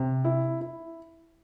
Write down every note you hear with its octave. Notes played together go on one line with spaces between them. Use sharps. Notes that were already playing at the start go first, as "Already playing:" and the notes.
Already playing: C3
E4
E4